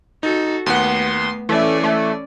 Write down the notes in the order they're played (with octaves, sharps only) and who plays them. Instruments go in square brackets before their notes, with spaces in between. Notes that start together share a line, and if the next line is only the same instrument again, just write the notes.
[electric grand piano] D#4 [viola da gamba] F#4 A4
[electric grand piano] D#2 F#5 [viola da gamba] A3 B3 [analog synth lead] C6
[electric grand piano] E3 [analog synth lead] A3 [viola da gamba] C#4 D5
[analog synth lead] A3